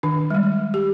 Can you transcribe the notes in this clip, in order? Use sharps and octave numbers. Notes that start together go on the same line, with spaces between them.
D#3 D4
G3 G#3
G4